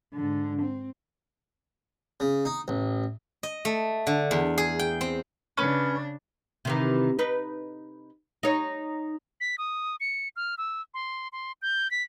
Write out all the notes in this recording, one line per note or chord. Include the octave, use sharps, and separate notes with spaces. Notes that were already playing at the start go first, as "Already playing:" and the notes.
G#2 D3
C4
C#3
D#4
A1
D#5
A3
D3
E2
G#4
G5
C4
C#3 C#4 D4 B4
C3 D#3 E3
D#4 B4
D#4 C#5
B6
D#6
C#7
F6
E6
C6
C6
G6
B6